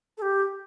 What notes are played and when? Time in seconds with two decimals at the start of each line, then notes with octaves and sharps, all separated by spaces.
0.18 A4
0.22 G4